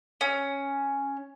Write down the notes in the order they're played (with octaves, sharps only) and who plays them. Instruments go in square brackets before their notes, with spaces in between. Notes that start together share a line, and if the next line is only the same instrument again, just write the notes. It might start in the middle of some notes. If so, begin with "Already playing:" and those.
[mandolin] C#4